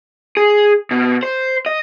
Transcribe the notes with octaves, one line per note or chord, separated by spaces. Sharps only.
G#4
B2
C5
D#5